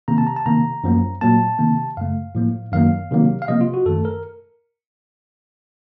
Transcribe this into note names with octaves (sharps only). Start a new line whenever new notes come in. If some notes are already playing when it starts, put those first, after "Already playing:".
C3 D#3 A#3 A#5
A5
A#5
A5
C3 D#3 A#3 A#5
F#2 F3 A#3
A#2 F#3 A#3 A5
C3 D#3 A#3
F#2 C#3 A3 F5
A2 F3 A#3
F#2 D#3 F#3 A#3 F5
C3 D#3 F#3 A#3
F5
C3 F3 A#3 D#5
F4
F#4
F#2 D#3 A3 A4
A#4